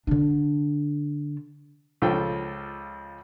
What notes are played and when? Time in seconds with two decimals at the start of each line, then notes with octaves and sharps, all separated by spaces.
0.07 D3 D4
2.02 C#2 F3 A4 G5